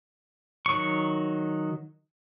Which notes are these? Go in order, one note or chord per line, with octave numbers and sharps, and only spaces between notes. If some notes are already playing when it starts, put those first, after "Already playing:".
D#3 F#3 C#6